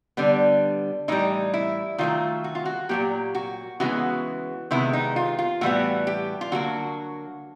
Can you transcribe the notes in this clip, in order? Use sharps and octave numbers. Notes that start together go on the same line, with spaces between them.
D3 G3 B3
A2 E3 G3 D#4
E4
D#3 F#3 A3 F4
F#4
F4
F#4
A#2 F#3 A#3 G4
F#4
C#3 E3 G#3 B3 F#4
C3 D#3 G#3 B3 E4
D#4
F4
F4
A2 E3 G3 B3 F#4
G4
F4
D3 F#3 A#3 F#4